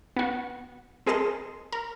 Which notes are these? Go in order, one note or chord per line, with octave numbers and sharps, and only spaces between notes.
B3 F#4
C4 G#4 A#4 D#5 A5 C6
A#4